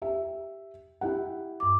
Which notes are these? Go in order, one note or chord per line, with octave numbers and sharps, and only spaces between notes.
G4 E5
E4 G4 F#5
G2 D6